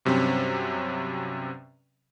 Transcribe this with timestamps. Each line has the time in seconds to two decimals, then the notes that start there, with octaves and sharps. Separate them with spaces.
0.05 G2 C3 F#3 C4 C#4